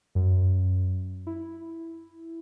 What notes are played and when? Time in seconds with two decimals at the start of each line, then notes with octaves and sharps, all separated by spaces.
0.15 F#2
1.27 E4